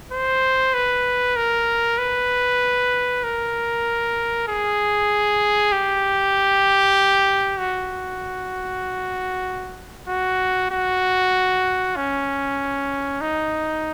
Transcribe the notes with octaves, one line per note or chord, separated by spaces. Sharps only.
C5
B4
A#4
B4
A#4
G#4
G4
F#4
F#4
F#4
C#4
D#4